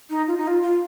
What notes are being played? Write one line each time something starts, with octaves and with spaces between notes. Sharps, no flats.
D#4
F4
D#4
F4
F4